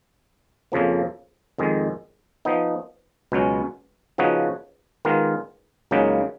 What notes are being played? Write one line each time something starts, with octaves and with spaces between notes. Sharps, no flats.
F2 C#3 F3 A#3
F2 D#3 G#3
F3 B3 D#4
C#2 B2 F#3 C#4
C#3 F3 B3 D#4 F#4
D#3 G#3 B3 F4 A#4
C#2 C#3 F#3 A#3 D#4